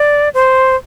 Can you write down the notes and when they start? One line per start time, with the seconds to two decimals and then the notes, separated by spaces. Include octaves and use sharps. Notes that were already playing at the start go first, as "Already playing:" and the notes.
Already playing: D5
0.34 C5